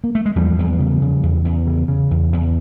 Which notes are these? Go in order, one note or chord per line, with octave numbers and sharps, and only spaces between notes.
A#3
A3
G#3
E2 F3 G3
E2
C#3
C#3
E2
E2
C#3
C#3
E2
E2